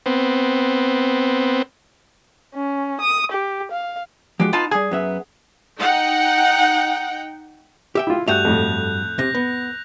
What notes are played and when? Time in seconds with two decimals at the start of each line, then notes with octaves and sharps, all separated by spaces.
0.06 B3 C4
2.55 C#4
3.01 D#6
3.31 G4
3.71 F5
4.40 F3 G#3 F#4 G4
4.53 B3 D#4 F4 A5
4.71 G3 G#4 G#5
4.91 F#2 B3 E5
5.78 D#4 F#5 G5
7.95 G4 E5 G5
8.07 E4 F4
8.28 G2 A3 F#4 E5 F#6 G6 F7
8.45 F2 A2
9.19 C3 A#6
9.35 B3